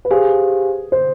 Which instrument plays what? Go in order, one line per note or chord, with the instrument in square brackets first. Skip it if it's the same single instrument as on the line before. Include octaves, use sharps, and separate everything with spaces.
[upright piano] B4
[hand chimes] G4 C5 F5 G#5 [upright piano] G#4
[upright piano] C5